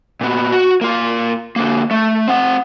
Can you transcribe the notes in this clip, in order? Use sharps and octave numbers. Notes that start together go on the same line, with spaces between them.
A#2 B3
F#4
A#3 F4
D3 A#3
A3
C4 F#5